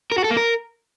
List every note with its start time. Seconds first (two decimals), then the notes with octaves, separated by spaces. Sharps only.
0.12 A#4
0.18 F#4
0.24 A4
0.30 A#3
0.37 A#4